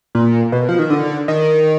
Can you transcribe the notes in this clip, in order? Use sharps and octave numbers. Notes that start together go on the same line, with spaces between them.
A#2
B2
F3
D#3
D3
D#3